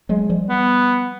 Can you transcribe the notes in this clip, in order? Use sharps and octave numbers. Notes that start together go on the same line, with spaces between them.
F#3 G#3
F3 G3
B3